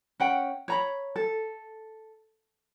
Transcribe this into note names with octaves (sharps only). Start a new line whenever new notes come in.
C#4 F#5 G5
C#5 A#5 B5
A4